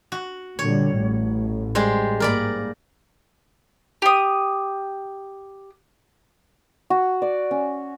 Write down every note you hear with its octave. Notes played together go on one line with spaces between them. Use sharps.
F#4
A#2 D3 G3 C#5
A1 A2
G3 G#3 C5
G#2 A#3 A#4 D5 B5
G4 D#6
F#4
D5
C#4